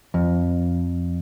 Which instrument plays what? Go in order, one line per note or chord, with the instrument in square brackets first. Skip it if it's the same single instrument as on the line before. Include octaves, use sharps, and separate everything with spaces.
[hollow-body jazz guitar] F2